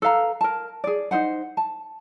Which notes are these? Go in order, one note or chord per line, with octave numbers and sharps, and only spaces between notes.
A4 B4 F5 A#5
A#4 A5
G#4 D5
D#4 F4 C5 F#5
A5